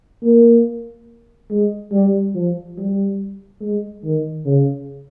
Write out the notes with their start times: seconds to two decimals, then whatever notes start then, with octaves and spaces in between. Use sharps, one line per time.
0.23 A#3
1.50 G#3
1.92 G3
2.35 F3
2.77 G3
3.61 G#3
4.04 D#3
4.46 C#3